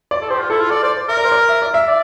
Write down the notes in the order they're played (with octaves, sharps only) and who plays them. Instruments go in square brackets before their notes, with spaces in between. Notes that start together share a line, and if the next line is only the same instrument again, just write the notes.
[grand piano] D5
[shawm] A4
[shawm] G4 [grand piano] C5
[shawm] F4
[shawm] E4 [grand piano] A4
[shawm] F4
[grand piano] A4 [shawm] D5
[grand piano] C5 [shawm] D5
[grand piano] C5
[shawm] A#4 [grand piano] E5
[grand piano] D5
C5
D5
E5
D5
E5
[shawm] D5